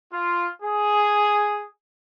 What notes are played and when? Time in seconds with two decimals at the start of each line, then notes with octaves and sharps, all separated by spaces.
0.11 F4
0.61 G#4